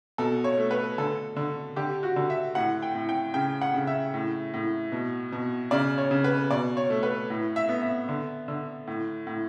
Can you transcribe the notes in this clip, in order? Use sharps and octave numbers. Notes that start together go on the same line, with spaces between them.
B2 A4
C#5
A3
B4
D3 A4
D3
D3 G4
F#4
D3
E5
A2 F#5
G5
A2
G5
C#3 G5
F#5
C#3
E5
A2
A2
B2
B2
C#3 D5
C#5
C#3
B4
B2 D5
C#5
A3
B4
A2
E5
B3
E5
D3
D3
A2
A2